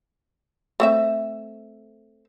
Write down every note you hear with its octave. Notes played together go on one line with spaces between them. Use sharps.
A3 C4 E5